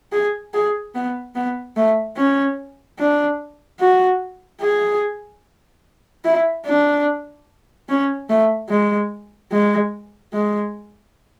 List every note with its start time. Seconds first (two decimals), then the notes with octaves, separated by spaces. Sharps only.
0.12 G#4
0.54 G#4
0.95 B3
1.35 B3
1.76 A3
2.17 C#4
2.99 D4
3.80 F#4
4.61 G#4
6.25 E4
6.66 D4
7.89 C#4
8.29 A3
8.70 G#3
9.52 G#3
10.33 G#3